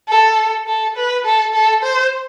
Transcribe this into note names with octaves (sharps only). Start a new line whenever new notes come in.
A4
A4
B4
A4
A4
C5